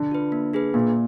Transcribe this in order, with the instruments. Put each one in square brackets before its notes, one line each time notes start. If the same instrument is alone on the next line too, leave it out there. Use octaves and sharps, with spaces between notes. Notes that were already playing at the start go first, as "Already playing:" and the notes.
Already playing: [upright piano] D3
[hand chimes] F4 B4
A#3
D4 G#4 B4
[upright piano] A#2 [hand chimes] A#3